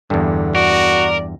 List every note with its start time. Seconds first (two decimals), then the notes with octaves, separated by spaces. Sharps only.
0.10 E2 G2 D3
0.55 F#4 A#4 D5